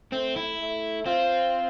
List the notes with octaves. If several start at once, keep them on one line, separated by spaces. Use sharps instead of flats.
A3 C4
E4
A3
C4 F4